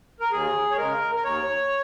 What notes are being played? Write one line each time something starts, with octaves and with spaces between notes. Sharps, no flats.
A#4
D#2 G#4
C#5
C#3 G#3 A#4
A#4
D#2 C#5